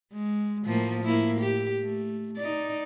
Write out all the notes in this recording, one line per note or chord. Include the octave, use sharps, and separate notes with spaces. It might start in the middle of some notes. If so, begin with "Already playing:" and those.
G#3
A2 F3 A#3
A2 A#3 E4
G4
A3
D#4 D5